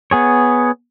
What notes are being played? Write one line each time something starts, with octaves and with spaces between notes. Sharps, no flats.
B3 G#4 C#5